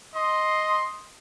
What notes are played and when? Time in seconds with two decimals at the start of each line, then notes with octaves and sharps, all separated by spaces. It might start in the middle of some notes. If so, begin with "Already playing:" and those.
0.15 D#5 C6